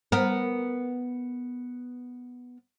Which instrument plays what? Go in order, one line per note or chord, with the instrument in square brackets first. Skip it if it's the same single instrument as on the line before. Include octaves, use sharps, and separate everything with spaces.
[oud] B3 A#4